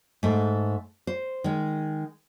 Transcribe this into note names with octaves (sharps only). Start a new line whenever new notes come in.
G#2 A3
C5
D#3 G#3